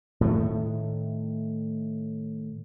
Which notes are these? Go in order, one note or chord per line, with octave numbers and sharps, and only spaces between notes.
A2 D#3 A3